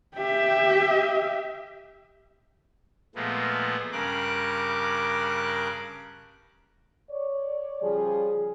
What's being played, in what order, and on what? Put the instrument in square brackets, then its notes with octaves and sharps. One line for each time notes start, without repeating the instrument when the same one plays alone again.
[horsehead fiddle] G4 E5
[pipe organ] A#2 F3 G#3 A3 B3
G2 C#3 A#4 D6 F#6
[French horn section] C#5 D5
C#3 F3 G3 G#4